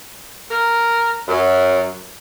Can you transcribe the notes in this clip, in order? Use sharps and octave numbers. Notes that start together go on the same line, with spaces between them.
A#4
F#2